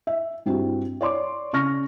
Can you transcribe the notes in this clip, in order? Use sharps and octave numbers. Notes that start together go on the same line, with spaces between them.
E5
G2 C4 E4 F#4 G4
C#5 D5 C6 D6
C#3 C#6 F6 A#6